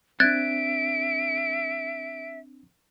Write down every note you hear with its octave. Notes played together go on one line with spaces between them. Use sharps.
C4 D4 E5 F#6 G#6 A6 D7